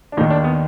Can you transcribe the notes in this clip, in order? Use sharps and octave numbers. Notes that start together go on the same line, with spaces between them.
D4
D#2 D#3 D#4
D4
B3